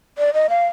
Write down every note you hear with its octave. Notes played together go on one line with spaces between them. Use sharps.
D5
D#5
F5